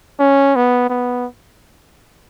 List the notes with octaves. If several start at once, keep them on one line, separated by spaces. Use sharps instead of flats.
C#4
B3
B3